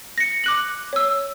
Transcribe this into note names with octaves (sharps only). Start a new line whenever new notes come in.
A#6 C#7
D6 F#6 F#7
C#5 E6